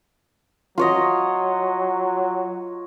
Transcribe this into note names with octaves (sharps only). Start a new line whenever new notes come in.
F#3 F4 C#5 D#5